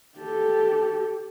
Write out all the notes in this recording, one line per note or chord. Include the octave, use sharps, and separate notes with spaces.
G4 A4